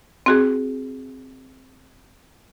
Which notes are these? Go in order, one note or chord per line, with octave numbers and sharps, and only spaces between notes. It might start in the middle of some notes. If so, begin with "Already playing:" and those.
C4 F#4 G#4